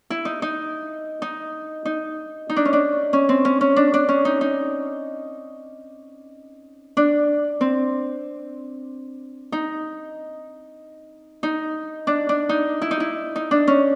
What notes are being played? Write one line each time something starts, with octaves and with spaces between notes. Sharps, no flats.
E4
D#4
D#4
D#4
D#4
D#4
D4
C#4
D4
C#4
C4
C#4
C#4
D4
D4
C#4
D#4
D#4
D4
C4
D#4
D#4
D4
D4
D#4
E4
D#4
E4
D#4
D4
C#4